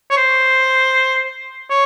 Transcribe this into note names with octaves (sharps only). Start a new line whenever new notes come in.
C#5
C5
C#5